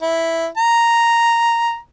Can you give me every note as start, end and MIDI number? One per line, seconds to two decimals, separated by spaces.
0.02 0.46 64
0.58 1.77 82